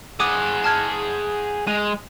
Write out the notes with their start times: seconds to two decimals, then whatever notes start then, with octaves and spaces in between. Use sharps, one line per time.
0.20 G#4 F#5 D6 D#6 D#7
0.64 A5 F6 G#6
1.67 G#3 D#7 F7